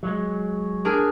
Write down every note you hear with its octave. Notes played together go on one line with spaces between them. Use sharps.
F#3 G#3
D4 G#4 A#4